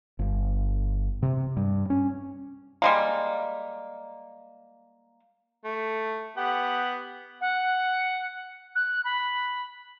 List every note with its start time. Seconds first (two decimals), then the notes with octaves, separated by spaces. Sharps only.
0.19 G1
1.22 C3
1.57 G2
1.90 C#4
2.82 G3 G#3 A#3
5.65 A3
6.37 B3 G4 F#5
7.41 F#5
8.75 F#6
9.04 B5